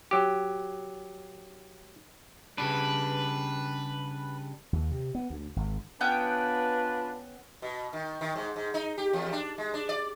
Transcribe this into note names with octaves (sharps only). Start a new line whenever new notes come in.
F#3 G4
C#3 G3 D4 B4
D#2
C3
B3
D2
G#1
B3 C#4 D4 F4 B4 G5
B2
D#3
D#3
G#2
G#2
D#4
G4
E2
D4
G#3
D4
D5